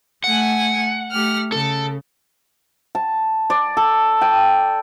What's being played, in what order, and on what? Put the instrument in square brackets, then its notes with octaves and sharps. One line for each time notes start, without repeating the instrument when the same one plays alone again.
[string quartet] A3 G#5 [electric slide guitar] F#5
[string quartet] A3 G4 F6
[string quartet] C#3 [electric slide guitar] A4
[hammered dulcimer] A5
D5
A4
G5